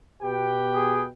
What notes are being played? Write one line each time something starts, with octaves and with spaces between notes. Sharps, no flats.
B2 G4 B4 G5
G#4